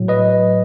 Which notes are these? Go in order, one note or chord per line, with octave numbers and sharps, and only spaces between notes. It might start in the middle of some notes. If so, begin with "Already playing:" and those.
Already playing: A2 F#3
B4 D#5